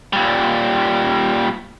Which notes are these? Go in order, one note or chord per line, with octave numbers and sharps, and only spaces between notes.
A#2 G3